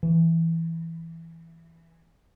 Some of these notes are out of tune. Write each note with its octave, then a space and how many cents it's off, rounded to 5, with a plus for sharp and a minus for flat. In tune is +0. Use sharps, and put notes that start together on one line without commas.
E3 +0